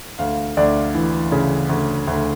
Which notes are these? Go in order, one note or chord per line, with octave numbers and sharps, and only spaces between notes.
D2 F5
D2 D5
E3
C#3
D2
D2